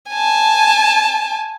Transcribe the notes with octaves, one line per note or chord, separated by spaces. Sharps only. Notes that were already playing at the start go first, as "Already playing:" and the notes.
G#5 A5